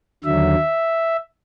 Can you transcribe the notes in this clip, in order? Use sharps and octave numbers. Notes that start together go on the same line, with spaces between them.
D#2 D3 F#3 E5